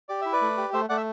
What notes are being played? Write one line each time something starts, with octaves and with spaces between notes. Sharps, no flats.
G4 D5
E4 E5
B4 D5
A3
G4
A3 C5 E5
A3 D5 F#5
E5